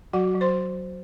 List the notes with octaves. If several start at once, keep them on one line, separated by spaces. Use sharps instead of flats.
F#3 F#4 F#5
F#3
C5 C6